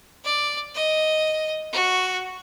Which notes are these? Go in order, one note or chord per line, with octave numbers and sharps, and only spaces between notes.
D5
D#5
F#4